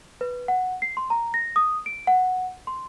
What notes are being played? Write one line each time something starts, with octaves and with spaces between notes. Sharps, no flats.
B4
F#5
C7
C6
A#5
A#6
D#6
D7
F#5
C6